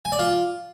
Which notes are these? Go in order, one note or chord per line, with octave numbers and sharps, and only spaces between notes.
G#5
D5
F4